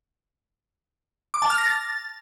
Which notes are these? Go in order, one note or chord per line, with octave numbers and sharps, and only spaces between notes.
D6
A5
F6
A#6
A6